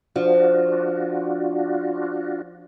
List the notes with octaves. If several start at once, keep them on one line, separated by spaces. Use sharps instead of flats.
F3 D4 F4 F#4